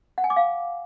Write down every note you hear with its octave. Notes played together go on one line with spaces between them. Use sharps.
F#5
G#5
D6
F5